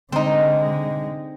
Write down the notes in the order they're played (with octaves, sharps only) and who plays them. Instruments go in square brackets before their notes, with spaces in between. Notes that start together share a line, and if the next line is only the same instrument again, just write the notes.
[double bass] D3 G#3 [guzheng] C4 D#4